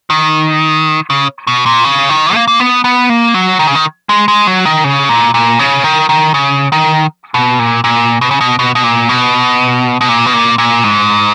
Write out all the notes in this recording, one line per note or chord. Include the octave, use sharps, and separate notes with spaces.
D#3
C#3
B2
A#2
C#3
D#3
A#3
A#3
B3
B3
A#3
F#3
D#3
C#3
D#3
G#3
G#3
F#3
D#3
C#3
A#2
A#2
C#3
D#3
D#3
C#3
D#3
B2
A#2
A#2
B2
C#3
B2
B2
B2
A#2
B2
B2
A#2
B2
A#2
A#2
G#2